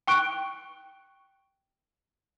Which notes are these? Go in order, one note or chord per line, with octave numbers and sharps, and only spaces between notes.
G5 C#6 F#6 D7